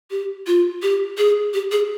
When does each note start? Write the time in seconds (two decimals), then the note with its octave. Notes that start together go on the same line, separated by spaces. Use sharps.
0.11 G4
0.47 F4
0.82 G4
1.18 G#4
1.54 G4
1.72 G#4